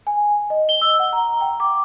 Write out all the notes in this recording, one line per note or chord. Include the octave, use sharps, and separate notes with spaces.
G#5
D#5
G7
E6
F#5
A#5
G5
D6